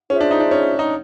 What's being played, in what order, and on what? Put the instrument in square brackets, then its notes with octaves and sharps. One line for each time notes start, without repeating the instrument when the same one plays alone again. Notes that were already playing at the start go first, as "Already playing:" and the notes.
[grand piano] C#4 [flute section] F4 G#4 C5 E5
[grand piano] D4
D#4
D4
C#4
D#4